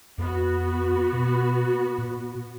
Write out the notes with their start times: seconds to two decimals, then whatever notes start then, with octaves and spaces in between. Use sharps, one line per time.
0.18 F2 B3 F#4
1.13 B2
1.98 A#2